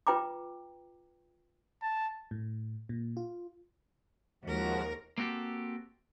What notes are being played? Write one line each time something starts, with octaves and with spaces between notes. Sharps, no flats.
F4 B4 G5 A#5 D6
A5
A2
A#2
F4
D#2 F3 G#3 F#4 A#4
A#3 C4 F#4 G4 A4